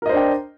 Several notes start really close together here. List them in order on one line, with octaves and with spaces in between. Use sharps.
A#4 D#5 C5 D4 G5